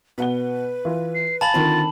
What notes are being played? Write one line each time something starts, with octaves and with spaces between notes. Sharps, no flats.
B2 B4 F#5 G7
E3 F4
C7
F5 G#5 A5 B5 A6 F#7
D3 D#3 C4 F4